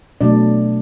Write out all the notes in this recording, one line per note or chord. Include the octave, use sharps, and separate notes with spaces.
B2 F#3 A3 D4 D5